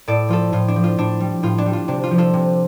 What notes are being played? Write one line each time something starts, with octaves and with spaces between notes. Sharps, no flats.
A2 A4 D5
F3 F4 A4
A2 F4
D4
F3
F4
A2 D4
G3
A2 F4
D4
G3
F4
C3 D4
F4
F3
F4 A4
C3